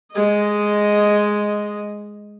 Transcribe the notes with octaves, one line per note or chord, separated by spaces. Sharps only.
G#3 D#5